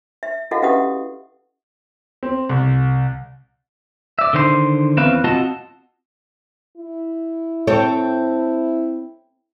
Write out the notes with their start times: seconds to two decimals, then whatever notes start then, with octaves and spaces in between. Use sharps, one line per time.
0.23 E5
0.51 E4 F#4 A4 D#5 F5 F#5
0.62 C#4 G4 B4 E5 F#5 D#6
2.23 C4
2.49 C2
4.19 D5 E5
4.33 D3 D#3 C5 F5 C6
4.97 E2 C4 C#4 B4 E5 F5
5.24 C4 F4 F#4 D#5 F#5 A5
6.77 E4
7.67 C4 A4 C#5